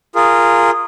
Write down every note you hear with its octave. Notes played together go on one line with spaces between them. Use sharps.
F4 G#4 A#4